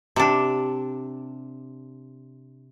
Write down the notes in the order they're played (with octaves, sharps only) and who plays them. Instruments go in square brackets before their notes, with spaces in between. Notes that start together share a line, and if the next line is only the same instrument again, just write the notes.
[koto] C3 D4